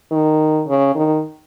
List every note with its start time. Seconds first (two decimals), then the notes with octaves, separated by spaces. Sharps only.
0.11 D#3
0.68 C#3
0.95 D#3